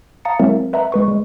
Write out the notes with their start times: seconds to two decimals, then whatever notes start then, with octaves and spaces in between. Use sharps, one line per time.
0.25 F5 A5 A#5 D#6 A6 C#7
0.39 F#3 G#3 C4 E4 A#4 E5
0.73 B4 E5 F#5 A#5 B5
0.92 G#3 B4 C#6
1.08 G#3